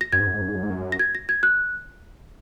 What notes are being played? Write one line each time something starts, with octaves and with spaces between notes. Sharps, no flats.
A#6
F#2 G#6
G#2
F#2
G#2
F#2
G#2
F#2
G#2
F#2
A#6
G#6
A#6
G#6
F#6